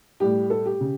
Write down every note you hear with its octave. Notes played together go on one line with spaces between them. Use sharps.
A2 G3 G4
A4
G4
C#3